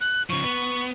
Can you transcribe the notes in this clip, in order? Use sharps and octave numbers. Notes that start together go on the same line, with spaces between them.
F#6
C#3 F3 C#6
B3